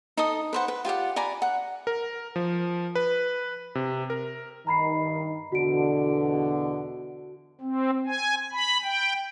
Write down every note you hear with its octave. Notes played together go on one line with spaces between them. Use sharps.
D#4 A4 D#5 D#6
B4 C5 F#5
B4
F4 G4 D5 F#5
D5 G#5 A#5 B5
F#5
A#4
F3
B4
C3
A#4
G2 D#3 A#5 B5 C7
E2 B2 D3 F#4 D7
C4
G#5
B5
G5